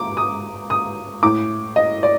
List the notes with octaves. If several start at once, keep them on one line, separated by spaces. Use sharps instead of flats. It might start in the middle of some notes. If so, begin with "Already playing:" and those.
Already playing: D6
D#6
D#6
A2 D6
D#5
D5